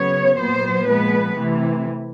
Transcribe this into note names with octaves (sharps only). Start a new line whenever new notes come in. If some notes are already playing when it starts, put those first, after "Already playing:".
Already playing: C#3 F#3 B3 C#5
A#2 F#3 B3 C5
A#2 F3 G#3 B3 B4
C3 E3 A3